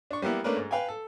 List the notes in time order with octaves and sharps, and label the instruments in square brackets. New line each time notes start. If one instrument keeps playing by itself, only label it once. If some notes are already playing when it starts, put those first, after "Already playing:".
[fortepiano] D4 C#6
G3 A#3 B3 E4
A3 A#3 C#4 D4 A#4 B4
G#2
B4 F5 G5 G#5
A4